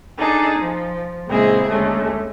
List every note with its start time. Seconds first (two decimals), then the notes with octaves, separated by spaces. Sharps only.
0.19 D4 D#4 G#4 A4
0.59 F3
1.28 A#2 C#3 G#3 C4 E4 G#4
1.69 D#2 D3 G#3 A3 C#4